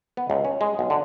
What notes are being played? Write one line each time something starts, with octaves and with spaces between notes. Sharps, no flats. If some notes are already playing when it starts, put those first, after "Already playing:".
B3
C#2
C#4
G#3
B1
D3